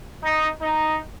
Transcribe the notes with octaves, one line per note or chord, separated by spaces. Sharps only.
D#4
D#4